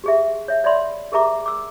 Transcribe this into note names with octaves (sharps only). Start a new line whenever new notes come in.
G4 G#4 E5
C#5 E5
C#5 D5 E5 F#5 B5 C6
G4 G#4 A#4 E5 A#5 D6
D6 E6